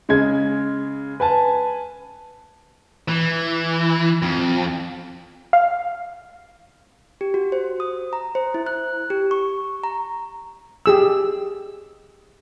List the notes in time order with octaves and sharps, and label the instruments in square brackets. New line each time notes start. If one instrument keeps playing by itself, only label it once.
[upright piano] C#3 G#3 G#6
B4 G#5 A5
[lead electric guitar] E3
F2
[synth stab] F5
[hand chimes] G4
F#4
C5
D#6
A#5
C5
E4
F#6
G4
C#6
A#5
[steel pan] G4 G#4 E6